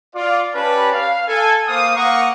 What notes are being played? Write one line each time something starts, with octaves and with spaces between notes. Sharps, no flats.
F4 D5
C#4 G4 B4 D5 A5 B5
F5
A4 G#5
A#3 C5 F5 D#6
A#3 F#5 A#5 C#6 D#6